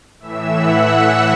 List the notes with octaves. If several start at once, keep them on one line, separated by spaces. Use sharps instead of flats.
A2 E3 E5 E6
F#5 F#6
E5 E6